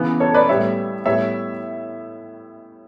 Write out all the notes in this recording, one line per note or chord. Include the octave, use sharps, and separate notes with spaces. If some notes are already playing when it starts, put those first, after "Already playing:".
Already playing: C#3 E3 B3
A4 C#5
B4 D5
A2 G3 B3 C#5 E5
A2 G3 B3 C#5 E5